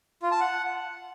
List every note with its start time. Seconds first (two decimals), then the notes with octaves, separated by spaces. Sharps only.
0.22 F4
0.31 A5
0.40 F#5